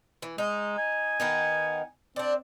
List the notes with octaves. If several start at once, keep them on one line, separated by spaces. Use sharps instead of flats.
E3
G#3 D#4
G#5
D#3 B3 D#4
C4 D4 D5